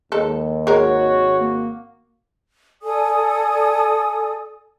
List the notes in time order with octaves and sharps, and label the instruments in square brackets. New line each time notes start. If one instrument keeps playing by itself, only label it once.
[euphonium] D#2 [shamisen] G#3 A4
[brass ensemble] G#1 F#4 [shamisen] G#3 A#4 [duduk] C#5
[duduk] A#3
[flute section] A4 D5 G#5 D#6